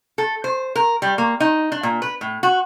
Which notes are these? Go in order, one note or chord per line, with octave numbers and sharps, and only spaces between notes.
A4
C5
A#4
G3
A#3
D#4
D4
A#2
B4
A2
F#4